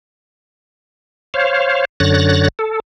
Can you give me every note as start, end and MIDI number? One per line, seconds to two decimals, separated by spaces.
1.34 1.85 72
1.34 1.85 73
1.34 1.85 77
2.00 2.48 42
2.00 2.48 50
2.00 2.48 73
2.00 2.48 90
2.00 2.48 93
2.00 2.48 94
2.59 2.80 69